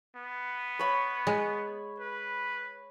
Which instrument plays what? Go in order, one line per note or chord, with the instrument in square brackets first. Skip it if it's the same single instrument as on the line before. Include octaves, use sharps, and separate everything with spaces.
[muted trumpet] B3
[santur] C#5 B5
[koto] G#3
[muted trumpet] B4